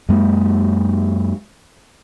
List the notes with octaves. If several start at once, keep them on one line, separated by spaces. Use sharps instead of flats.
F#2 G#3 A#3